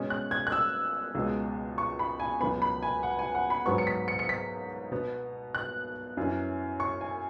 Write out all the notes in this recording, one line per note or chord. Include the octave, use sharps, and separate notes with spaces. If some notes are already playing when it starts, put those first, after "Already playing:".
Already playing: B2 G#3 C#4
F#6
G#6
F#6
E6
C#2 B2 G#3
C#6
B5
G#5
C#2 B2 F#3 B3 B5
B5
G#5
F#5
G#5
F#5
B5
G#2 F#3 B3 C#6
C#7
B6
C#7
C#7
B6
B2 B3
F#6
F#2 E3 C#4
C#6
G#5